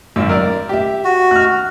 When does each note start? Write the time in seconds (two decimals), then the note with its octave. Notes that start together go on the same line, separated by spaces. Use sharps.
0.16 G#1 F#2 E6
0.29 A#4 D5
0.69 G4 E5
1.05 F#4
1.31 F6 F#6